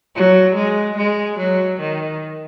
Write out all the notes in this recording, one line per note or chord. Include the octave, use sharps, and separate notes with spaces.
F#3
G#3
G#3
F#3
D#3